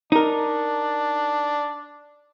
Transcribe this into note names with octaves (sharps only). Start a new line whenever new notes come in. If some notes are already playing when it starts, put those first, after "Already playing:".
D4 D#4 A#4